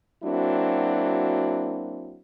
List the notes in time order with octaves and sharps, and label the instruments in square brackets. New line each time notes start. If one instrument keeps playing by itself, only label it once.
[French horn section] F#3 A#3 C4 D4 E4 F#4